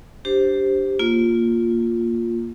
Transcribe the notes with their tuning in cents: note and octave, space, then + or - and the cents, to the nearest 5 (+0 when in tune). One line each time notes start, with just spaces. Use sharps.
D4 +0 G4 +0 C5 +0
A#3 +0 F4 +0